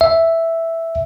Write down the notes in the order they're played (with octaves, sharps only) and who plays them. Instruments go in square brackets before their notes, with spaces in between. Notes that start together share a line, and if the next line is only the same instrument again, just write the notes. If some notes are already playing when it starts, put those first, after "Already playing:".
[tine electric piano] E5